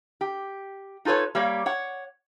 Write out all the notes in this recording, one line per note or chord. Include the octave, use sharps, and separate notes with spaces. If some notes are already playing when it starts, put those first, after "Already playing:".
G4
D#4 F4 A4 B4 C#5
G3 A#3 G4 C#5 F5
C#5 F#5